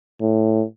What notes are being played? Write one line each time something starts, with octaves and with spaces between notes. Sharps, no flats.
A2